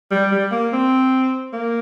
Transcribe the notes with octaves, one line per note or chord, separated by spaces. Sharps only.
G3
G3
A#3
C4
A#3